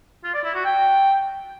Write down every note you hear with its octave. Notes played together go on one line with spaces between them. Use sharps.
F4
D5
E4
F#4
G5